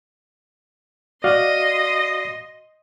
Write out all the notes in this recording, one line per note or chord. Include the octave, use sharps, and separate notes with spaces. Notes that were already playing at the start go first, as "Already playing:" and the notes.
F#4 D5 D#5 F5 C6